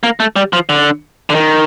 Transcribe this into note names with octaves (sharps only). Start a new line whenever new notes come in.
A#3
A3
G3
F3
D3
D3
D#3